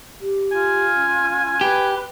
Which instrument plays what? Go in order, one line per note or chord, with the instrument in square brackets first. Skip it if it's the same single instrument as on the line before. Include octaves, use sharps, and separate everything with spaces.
[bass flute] G4
[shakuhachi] F4 [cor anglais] G#5
[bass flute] C#4
[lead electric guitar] G4 [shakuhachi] B4